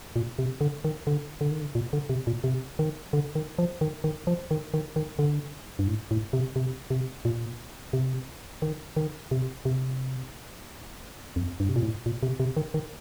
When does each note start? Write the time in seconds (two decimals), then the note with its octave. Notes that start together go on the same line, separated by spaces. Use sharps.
0.16 A#2
0.39 C3
0.61 D3
0.84 D#3
1.07 D3
1.41 D3
1.51 D#3
1.61 D3
1.75 A#2
1.93 D3
2.09 C3
2.27 A#2
2.44 C3
2.79 D#3
3.13 D3
3.35 D#3
3.58 F3
3.81 D#3
4.04 D#3
4.27 F3
4.51 D#3
4.74 D#3
4.96 D#3
5.19 D3
5.79 G2
5.88 A2
6.11 A2
6.33 C3
6.56 C3
6.90 C3
7.25 A#2
7.93 C3
8.62 D#3
8.97 D#3
9.31 C3
9.65 C3
11.36 F2
11.60 G2
11.69 C3
11.76 A#2
11.83 A2
12.06 A#2
12.23 C3
12.40 C3
12.57 D#3
12.74 D#3